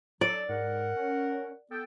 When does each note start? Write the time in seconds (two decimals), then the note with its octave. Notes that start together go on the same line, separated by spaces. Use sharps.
0.21 F#3 A4 D5
0.49 G#2 A#4 F#5
0.96 C#4
1.71 B3 A4 G5